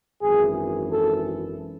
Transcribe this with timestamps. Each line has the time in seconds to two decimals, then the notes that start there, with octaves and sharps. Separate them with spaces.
0.22 G#1 F#2 E3 G#4
0.91 A4